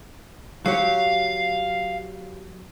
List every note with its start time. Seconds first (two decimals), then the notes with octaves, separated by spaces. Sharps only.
0.66 F#3 G4 C#5 F5